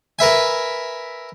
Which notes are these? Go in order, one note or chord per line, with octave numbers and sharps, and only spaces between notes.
A#4 B4 E5 G#5